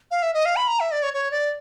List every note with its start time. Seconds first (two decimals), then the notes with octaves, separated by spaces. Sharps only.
0.11 F5
0.23 E5
0.34 D#5
0.45 F5
0.56 B5
0.68 A#5
0.80 E5
0.91 D5
1.03 C#5
1.14 C#5
1.31 D5